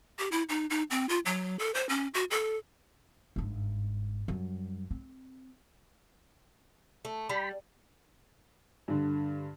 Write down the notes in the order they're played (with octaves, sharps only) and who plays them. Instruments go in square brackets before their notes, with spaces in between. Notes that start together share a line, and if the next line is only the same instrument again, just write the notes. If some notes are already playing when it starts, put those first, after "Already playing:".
[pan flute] G4
E4
D#4
D#4
C4
F4
F#3
A4
C5
C#4
F#4
A4
[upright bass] G1 G#2
F#2 G3
C4
[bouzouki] A3
[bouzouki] G3 [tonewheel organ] B5
[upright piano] G2 D3